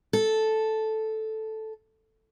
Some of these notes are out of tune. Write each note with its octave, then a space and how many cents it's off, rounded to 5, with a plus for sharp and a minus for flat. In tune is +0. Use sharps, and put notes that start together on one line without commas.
A4 -5